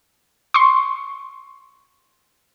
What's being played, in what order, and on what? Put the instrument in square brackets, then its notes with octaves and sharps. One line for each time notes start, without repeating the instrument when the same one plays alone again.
[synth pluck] C6 C#6